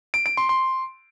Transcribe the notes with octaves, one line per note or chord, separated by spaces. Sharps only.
D7
D7
C6
C6